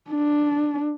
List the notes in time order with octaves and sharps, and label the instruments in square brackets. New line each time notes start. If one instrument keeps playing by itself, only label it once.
[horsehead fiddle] D4